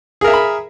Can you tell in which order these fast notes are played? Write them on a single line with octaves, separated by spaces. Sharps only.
G#4 A#4 E5 A#5 B5